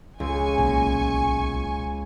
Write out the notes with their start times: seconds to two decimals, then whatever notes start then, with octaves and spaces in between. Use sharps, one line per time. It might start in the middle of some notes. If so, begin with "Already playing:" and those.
0.20 C#2 G#5 C#6
0.58 B1 A#2